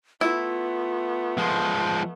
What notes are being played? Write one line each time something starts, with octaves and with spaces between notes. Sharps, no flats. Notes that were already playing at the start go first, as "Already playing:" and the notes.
A3 B3 E4 F4
F3 G#3 C6